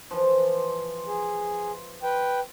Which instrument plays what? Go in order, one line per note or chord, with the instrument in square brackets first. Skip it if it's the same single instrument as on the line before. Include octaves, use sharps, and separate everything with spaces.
[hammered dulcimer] E3 F3
[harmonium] G#4
B4 G5